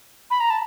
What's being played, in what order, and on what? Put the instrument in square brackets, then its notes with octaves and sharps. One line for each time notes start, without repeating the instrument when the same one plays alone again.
[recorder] B5
A#5
A5